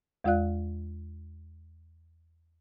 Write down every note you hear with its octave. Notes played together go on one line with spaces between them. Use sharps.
E2 G#3 F4 D5 F5 F#6